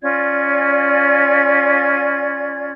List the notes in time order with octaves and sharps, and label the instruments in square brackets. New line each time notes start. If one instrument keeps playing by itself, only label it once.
[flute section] C#4 F4 D5 G#6